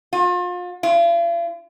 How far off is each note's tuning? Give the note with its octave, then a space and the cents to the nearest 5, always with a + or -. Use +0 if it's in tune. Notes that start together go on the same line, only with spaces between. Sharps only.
F4 +35
F4 -45